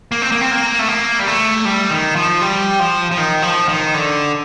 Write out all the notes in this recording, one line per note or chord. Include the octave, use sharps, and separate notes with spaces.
A#3
C4
A#3
C4
A#3
A3
A#3
G3
A3
G3
D#3
F3
G3
F3
F3
D#3
F3
D#3
D3